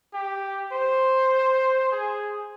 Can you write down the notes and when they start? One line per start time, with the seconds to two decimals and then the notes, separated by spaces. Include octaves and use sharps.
0.14 G4
0.73 C5
1.92 G#4